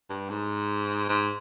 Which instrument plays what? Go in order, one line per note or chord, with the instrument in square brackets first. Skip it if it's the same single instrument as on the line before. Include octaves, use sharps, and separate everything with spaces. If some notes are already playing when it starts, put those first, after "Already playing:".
[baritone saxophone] G2
G#2
G#2